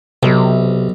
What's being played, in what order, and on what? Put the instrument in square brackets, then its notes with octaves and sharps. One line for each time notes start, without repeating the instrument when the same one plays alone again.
[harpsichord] B1 [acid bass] C3